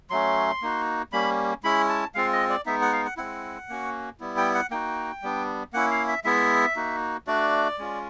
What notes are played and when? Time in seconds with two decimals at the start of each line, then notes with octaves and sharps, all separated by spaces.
0.10 F#3 A3 C#4 C6
0.62 A#3 D#4 F#4
1.12 G3 A#3 C#4 B5
1.63 G#3 C#4 E4 B5
1.89 A5
2.15 G#3 C4 F4 F5
2.33 D#5
2.49 D5
2.66 G#3 B3 D#4 E5
2.81 F#5
2.93 F5
3.05 F#5
3.17 G#3 C4 E4 F#5
3.69 A#3 C#4 F#4
4.20 G3 B3 E4
4.37 G5
4.55 F#5
4.71 A#3 D#4 F#4 G5
5.23 G3 B3 D4
5.73 A#3 C#4 E4 F#5
5.91 F5
6.08 E5
6.24 G#3 B3 E4 E5
6.76 A#3 D#4 F#4
7.27 A3 D4 F#4 D5
7.78 G#3 C#4 F4